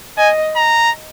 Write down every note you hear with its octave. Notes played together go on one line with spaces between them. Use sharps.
D#5 G#5
A#5